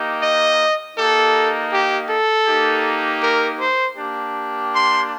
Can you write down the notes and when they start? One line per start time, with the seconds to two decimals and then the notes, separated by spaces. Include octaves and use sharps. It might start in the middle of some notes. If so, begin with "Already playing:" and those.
Already playing: A#3 D#4 G4
0.21 D#5
0.96 A#3 D#4 G4 A4
1.71 G4
2.09 A4
2.46 A#3 D#4 G4
3.21 A#4
3.59 C5
3.96 A#3 D4 G4
4.72 C6